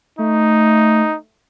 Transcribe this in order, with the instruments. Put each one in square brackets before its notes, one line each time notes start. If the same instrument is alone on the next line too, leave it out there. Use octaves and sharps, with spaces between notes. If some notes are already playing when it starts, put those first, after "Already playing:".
[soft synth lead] A3 [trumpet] D#4